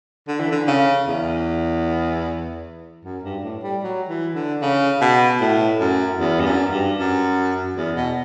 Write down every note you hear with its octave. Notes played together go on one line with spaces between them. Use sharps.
D3
E3
D3
C#3
E2
F#2
G2
A2
G3
F#3
E3
D3
C#3
B2
A2
F#2
E2
G2
F#2
G2
F#2
E2
B2